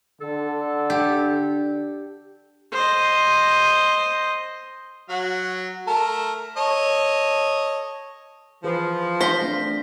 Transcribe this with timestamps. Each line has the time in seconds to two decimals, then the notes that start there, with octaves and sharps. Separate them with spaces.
0.21 D3 A4
0.90 D4 G4
2.73 C5 D#5
5.09 F#3 F#5
5.87 A3 A#4 A5
6.57 A4 C#5 D#5
8.64 E3 F3 G#4 B4
9.21 C5 A#6 B6 G7
9.42 A3 C4 D4